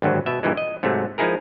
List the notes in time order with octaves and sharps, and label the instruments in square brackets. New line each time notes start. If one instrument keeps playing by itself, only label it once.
[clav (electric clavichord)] G#1 D2 G2 F#3
B2 E5
G2 A#2 E3 G#3
D#5
G#2 C3 F#3 A3
F3 G#3 D#4 E4 G#4 A#4